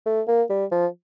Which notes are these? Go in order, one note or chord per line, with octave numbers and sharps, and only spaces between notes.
A3
A#3
G3
F3